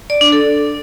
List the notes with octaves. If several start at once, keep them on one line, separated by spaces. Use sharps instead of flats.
D5
D4
A4